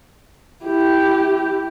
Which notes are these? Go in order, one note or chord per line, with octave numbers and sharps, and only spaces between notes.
E4 G4